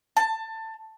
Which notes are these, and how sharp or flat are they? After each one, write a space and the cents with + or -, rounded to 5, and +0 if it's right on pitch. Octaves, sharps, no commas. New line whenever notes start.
A5 +20